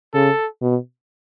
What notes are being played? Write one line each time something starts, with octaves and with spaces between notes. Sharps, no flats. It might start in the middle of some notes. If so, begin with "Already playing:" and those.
C#3 A4
B2